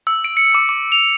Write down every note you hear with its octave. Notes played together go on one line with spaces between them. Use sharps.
E6
D7
C#7
D6
D6
F7